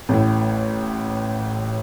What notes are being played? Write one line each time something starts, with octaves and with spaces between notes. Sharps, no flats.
A1 A2